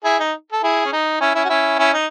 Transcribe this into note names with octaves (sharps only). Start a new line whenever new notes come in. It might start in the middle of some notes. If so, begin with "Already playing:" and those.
E4 G#4
D#4
A4
E4 G#4
C#4
D#4
C#4 E4
C#4 E4
F#4
C#4 E4
C#4 E4
D#4